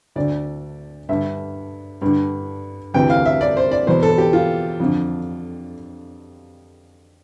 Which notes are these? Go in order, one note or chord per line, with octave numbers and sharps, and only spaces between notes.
D2 D3 D5
G2 D3 E5
G2 D3
D2 C3 E3 G5
F5
E5
D5
C5
D5
E2 B2 C5
A4
G4
F4
F2 D3